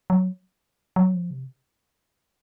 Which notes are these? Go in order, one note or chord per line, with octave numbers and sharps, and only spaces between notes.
F#3
F#3
F3
C3